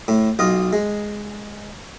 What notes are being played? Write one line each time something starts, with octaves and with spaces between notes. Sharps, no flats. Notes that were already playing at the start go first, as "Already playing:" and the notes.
A2
B1 F4 D#5
G#3